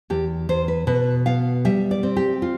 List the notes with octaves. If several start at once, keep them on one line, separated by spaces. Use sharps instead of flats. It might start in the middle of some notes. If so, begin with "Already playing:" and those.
E2 G4
E2 C5
B4
B2 B4
B3 F5
G3 E5
D5
C4
G4
F4